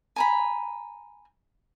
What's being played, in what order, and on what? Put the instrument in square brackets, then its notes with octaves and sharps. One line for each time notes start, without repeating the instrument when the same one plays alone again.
[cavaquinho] G#5 A#5 B5